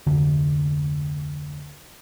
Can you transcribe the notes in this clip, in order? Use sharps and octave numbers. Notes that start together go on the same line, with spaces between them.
F1 D2 D3